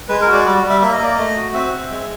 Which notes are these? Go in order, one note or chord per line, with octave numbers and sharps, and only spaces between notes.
G#3 B4
A#4
F#4
D5
G3 D5
G3
E5
A#3 E5
D#5
A#3 D5
A3 D#5
F#4
C4 E5
C4
G#3